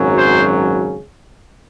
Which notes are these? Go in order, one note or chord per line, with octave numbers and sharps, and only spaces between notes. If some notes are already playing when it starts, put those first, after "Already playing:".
Already playing: G#1 F#2 C#3 F#3
C5